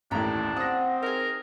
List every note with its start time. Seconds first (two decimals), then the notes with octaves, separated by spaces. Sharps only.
0.11 A1 D#2 A2 D4 A#5 B5
0.56 C4 F#5 D#6 A#6
1.03 D#4 G#4 A#4